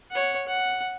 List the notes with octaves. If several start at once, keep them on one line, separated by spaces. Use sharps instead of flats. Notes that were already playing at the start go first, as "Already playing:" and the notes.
C#5 F#5
F#5